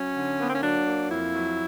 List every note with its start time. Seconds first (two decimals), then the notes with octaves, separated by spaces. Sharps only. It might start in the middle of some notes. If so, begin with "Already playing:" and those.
Already playing: F#3 C#4
0.15 D3
0.39 A#3 B3
0.48 C4
0.55 C#4
0.62 F#3 D4
0.86 A#3
1.09 F2 E4
1.33 F#3